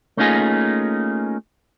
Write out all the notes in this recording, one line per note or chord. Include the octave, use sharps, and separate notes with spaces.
A3 A#3 C#4 D#4 F4 G#4